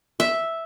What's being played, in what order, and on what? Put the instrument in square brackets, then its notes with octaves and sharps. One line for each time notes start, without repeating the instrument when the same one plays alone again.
[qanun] E5